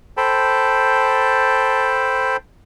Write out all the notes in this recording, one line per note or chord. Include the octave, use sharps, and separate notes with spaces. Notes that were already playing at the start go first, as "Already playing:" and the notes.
A4 C5 G5 A5 B5